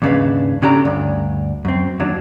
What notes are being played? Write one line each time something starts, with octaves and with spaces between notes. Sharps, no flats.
D#2 G#2 C#3 D4 B4 F5
C#3 C#4 D4 G4 A4 A#5
D2 G2
F#2 C4
D#2 F#3 D4